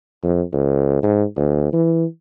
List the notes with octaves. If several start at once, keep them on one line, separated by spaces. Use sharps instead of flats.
F2
C#2
G#2
D2
E3